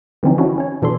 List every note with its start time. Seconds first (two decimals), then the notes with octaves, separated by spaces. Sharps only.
0.23 D3 E3 F3 C4 C#4 D#4
0.38 C#4 D4 E4 F#4
0.58 C#4 C#5
0.82 B2 E3 D4 A4 C6